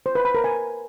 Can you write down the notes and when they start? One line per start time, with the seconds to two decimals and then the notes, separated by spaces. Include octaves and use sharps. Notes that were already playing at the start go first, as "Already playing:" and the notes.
0.06 C5
0.15 B4
0.25 B5
0.35 A#4
0.44 G#5